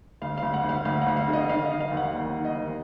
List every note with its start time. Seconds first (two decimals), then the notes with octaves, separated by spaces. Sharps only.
0.22 D2 F5
0.38 D2 F5
0.54 F#5
0.64 D2
0.69 F5
0.85 D2 F5
1.02 F#5
1.07 D2
1.17 F5
1.28 D3
1.33 D#5
1.49 D#3 F5
1.65 D#5
1.70 D#3
1.80 F5
1.91 D#2
1.97 F#5
2.13 D#2
2.34 D#3
2.45 D#5
2.56 D#2